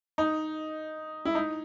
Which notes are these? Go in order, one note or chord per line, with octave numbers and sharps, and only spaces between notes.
D#4
E4
D#4